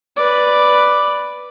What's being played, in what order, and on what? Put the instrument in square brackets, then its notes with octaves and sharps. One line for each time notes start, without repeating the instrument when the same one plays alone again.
[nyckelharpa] B4 D5